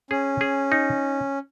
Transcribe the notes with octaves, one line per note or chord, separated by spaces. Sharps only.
C#4 G#4
G#4
D#4